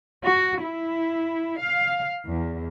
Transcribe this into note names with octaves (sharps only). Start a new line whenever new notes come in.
F#4
E4
F5
E2